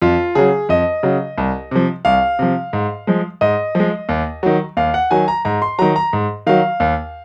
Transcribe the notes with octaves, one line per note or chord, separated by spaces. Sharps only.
F2 F4
C#3 F#3 G#4
F2 D#5
C#3 F#3
C2
C3 F3
C2 F5
C3 F3
G#2
F3 G#3
G#2 D#5
F3 G#3
D#2
D#3 F#3
D#2 F5
F#5
D#3 F#3 G#5
A#5
G#2 A#5
C6
D#3 F#3 A#5
A#5
G#2
D#3 F#3 F5
D#2